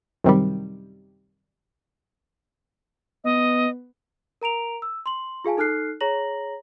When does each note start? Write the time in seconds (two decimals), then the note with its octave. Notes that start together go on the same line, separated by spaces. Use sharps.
0.24 F#2 C3 D#3 G3
3.24 B3 D#5
4.42 A#4 A#5 D7 F7
4.82 E6
5.06 C6 F#7
5.44 F4 G#4 F5 G#5 A5
5.57 D#4 A4 F6 F#6 C7
6.01 G#4 C#5 A#5 A#6 F#7